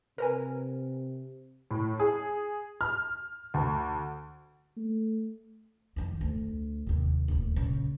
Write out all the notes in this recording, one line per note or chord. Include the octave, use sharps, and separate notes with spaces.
C3 A#4 B4 G#5
A2
G#4
F6
D2
A3
F2 D#3
D2
D#2 C3
D#1 D2
A#2 C#3